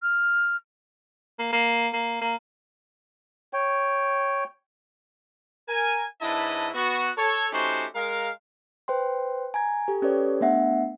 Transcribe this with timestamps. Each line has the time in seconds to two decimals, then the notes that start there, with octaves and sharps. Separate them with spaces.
0.03 F6
1.39 A#3
1.53 A#3
1.93 A#3
2.22 A#3
3.53 C#5 G5
5.69 A#4 G#5
6.22 G#2 D4 E4 B4 D#5 A5
6.75 B3 F#4
7.17 A4 C#5
7.52 A3 C#4 D#4 F#4 G4 C5
7.95 G#3 A#4 F5
8.88 B4 C5 G5 C6
9.54 G#5 A#5 G#6
9.88 G4 A4
10.02 C#4 G4 A4 B4 C#5 D5
10.41 A3 B3 D4 E5 F#5